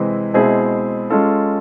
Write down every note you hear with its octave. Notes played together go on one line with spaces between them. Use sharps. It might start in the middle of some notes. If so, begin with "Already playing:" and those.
Already playing: C3 E3 G#3 C4
B2 G#3 C4 E4 G#4
G#3 C#4 F4 A4